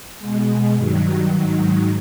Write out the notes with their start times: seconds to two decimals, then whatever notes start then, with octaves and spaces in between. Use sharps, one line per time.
0.19 B2 G#3
0.75 G2 D#3 F#3
1.33 G#2 D#3 F#3